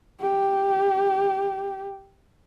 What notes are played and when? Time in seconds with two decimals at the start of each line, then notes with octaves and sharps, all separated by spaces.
0.21 G4